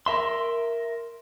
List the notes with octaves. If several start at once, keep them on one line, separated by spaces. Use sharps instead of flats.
A#4 E5 C6